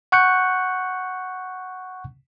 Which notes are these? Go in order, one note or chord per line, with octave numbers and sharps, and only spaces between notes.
F#5 C#6 F#6 G6 C#7